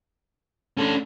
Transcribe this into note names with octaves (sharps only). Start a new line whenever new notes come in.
F1 C#4 D4 A4